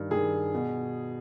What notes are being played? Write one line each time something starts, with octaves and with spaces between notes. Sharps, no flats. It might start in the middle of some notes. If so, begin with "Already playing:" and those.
Already playing: G2 D#3
G2 D#3 G#4
B2